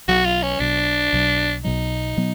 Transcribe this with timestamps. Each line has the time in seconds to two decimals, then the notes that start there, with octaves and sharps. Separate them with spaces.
0.08 B1 B2 F#3 F#4
0.25 F4
0.43 C#4
0.60 B1 B2 F#3 D4
1.13 B1 B2 F#3
1.64 B1 B2 F#3 D#4
2.17 B2 F#3 B3